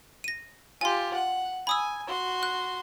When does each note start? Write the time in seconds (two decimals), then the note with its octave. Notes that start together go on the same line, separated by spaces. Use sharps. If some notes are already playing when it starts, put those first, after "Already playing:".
0.24 A#6 D#7
0.81 F4 G4 G#5 C6
1.14 F#5
1.67 G#5 B5 D#6 E6
2.08 F#4 C6
2.43 F#6